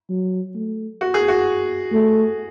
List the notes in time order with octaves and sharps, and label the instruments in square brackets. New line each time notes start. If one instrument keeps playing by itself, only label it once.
[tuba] F#3
A3
[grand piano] F#4
G#4
F#4
[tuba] A3